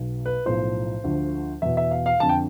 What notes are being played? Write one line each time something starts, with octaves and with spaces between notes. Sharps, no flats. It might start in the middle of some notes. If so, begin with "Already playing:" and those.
Already playing: B1 B2
B4
B1 A2 F3 C5
D2 D3 F3
E2 B2 E5
E5
F5
F5
F2 D3 A5
G5